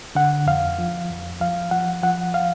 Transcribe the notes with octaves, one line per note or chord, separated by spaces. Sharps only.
D3 F#5
F2 F5
F3
F2
F3 F5
F3 F#5
F3 F#5
F5